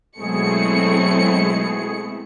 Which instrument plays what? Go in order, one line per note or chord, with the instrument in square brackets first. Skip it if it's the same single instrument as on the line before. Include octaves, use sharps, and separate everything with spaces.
[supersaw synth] B2 G#4 [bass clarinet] F#3 [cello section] G#3 C4 E4 [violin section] A3 C#7